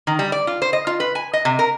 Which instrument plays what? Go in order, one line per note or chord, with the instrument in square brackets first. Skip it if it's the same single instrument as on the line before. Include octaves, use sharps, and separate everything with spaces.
[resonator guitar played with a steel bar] D#3
G3
D5
F4
C5
D#5
F4
B4
G#5
D#5
C3
A#4